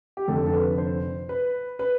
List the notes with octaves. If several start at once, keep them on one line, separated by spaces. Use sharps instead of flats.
G4
F1 F2 D3 A4
A4
B4
C5
B4
B4